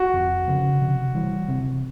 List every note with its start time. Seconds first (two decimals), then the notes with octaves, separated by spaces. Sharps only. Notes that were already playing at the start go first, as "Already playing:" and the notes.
Already playing: F#4
0.13 F2
0.48 C#3 F3
0.82 C3
1.15 E3 G3
1.48 C3